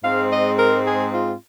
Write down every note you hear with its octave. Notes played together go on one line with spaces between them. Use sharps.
G#2 G#3 C4 F5
D#5
A#4
G#4
F4